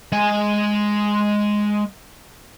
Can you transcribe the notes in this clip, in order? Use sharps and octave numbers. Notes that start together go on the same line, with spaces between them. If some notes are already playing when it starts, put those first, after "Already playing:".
G#3 G#5